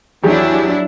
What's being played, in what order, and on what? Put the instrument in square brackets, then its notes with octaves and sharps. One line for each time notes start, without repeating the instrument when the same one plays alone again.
[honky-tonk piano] E2 G4 G#4 [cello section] F#3 D4 E4